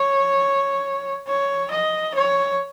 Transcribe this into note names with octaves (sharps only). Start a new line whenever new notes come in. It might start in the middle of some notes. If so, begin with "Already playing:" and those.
Already playing: C#5
C#5
D#5
C#5